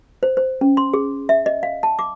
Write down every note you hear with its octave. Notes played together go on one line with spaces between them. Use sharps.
C5
C5
C#4
C6
G#4
E5
D#5
F5
A5
D6